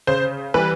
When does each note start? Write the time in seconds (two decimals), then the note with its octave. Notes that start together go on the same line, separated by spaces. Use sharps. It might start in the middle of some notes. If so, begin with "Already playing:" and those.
0.07 C#3 C5
0.54 E3 G3 B4